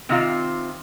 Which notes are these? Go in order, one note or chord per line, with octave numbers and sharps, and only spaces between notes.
C3 D#3 C4 F4